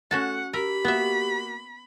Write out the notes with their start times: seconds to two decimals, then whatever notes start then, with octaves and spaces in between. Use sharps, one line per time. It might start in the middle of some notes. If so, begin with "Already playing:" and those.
0.11 A3 C#4 F#4 F#5 A5
0.53 G4 A#4 B5 E6
0.85 A#3 B3 F#4 E5